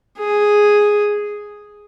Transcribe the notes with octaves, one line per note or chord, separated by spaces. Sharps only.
G#4